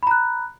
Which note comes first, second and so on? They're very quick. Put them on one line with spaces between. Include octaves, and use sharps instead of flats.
B5 A#5 F#6